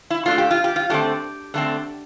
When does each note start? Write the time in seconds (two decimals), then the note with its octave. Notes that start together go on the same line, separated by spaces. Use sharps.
0.10 E4
0.25 A#2 A3 D4 F4
0.38 G4
0.51 F4
0.64 G4
0.76 F4
0.90 D3 A3 C4 G4
1.54 D3 A3 C4